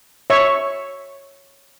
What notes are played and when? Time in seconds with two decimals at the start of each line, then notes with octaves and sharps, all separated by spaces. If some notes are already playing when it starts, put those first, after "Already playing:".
0.30 C#5 E5 C#6